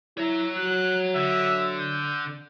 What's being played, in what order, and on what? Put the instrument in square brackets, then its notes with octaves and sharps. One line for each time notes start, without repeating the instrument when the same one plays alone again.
[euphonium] E4 [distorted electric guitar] C#5 A#5 [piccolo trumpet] E5
[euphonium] F#3 [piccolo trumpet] F#6
[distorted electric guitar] D3 [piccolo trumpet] E5
[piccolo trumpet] G6